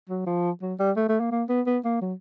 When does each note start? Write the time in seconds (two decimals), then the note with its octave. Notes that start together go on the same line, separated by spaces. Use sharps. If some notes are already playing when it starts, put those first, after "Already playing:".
0.09 F#3
0.26 F3
0.62 F#3
0.79 G3
0.96 A3
1.09 A3
1.20 A#3
1.31 A#3
1.49 B3
1.66 B3
1.84 A#3
2.01 F#3